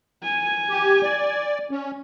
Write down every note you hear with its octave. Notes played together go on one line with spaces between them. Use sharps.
G#5
G4
D5
C#4